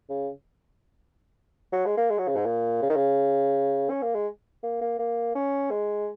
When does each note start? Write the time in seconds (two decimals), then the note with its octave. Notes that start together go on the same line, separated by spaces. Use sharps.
0.10 C#3
1.72 F#3
1.86 G#3
1.97 A#3
2.10 G#3
2.18 F#3
2.28 C#3
2.36 G#2
2.45 A#2
2.82 C#3
2.90 D#3
2.96 C#3
3.90 C#4
4.02 A#3
4.14 G#3
4.63 A#3
4.81 A#3
4.99 A#3
5.35 C#4
5.71 G#3